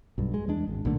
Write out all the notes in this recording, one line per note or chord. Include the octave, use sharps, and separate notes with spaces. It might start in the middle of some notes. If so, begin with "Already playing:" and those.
B1 G2
G#3
E2 G#3 D4
G#1
B1 A#2 D3 A3